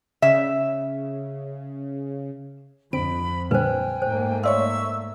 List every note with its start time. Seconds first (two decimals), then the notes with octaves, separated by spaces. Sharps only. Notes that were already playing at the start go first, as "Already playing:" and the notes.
0.22 C#3 E5
2.93 F2 D3 C4 B5 D7
3.51 A#2 D3 G3 B4 C5 G5 G#5
4.02 G#2 A3 A#3 C5
4.43 C#5 D5 E5 F5 C6 C#6 E6